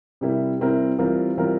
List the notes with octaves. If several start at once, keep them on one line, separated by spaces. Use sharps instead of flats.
C3 G3 C4 E4 A#4
C3 G3 C4 E4 A#4
E3 G3 C4 F4 A#4
E3 G3 C4 F4 A#4